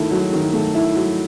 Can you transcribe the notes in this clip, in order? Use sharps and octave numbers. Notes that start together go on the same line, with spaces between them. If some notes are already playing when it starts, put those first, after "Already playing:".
Already playing: D#3 A3 E4
F#3
D#3
A3
E4
F#3